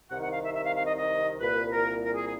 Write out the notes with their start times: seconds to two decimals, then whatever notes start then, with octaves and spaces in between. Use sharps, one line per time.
0.10 C2 C3 D#3 F#5
0.21 F#5
0.31 F5
0.42 E5
0.53 E5
0.63 F5
0.74 F5
0.85 D#5
0.96 D#5
1.39 C2 A#2 B4
1.70 A#4
2.03 A#4
2.14 G#4
2.25 G#4